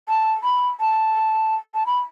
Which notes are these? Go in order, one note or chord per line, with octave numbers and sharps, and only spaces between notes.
A5
B5
A5
A5
B5